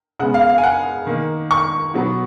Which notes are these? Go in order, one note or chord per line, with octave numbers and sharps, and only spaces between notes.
C#3 G#3 B3 F#5
F5
F5
G#5
F#5
D#3 A#3
C#6
B2 F#3 B3